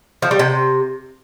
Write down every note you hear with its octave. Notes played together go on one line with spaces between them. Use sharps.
F3
G3
C3